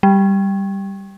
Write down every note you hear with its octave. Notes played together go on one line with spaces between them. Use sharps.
G3